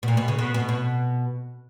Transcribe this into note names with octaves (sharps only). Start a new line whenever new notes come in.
B2
A#2
B2
C#3
B2
B2
B2